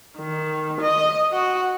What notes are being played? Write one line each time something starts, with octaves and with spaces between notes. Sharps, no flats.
D#3
D#5
F#4